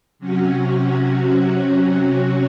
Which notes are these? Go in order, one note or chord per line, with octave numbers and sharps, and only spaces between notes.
C3 F#3 C#4 F#4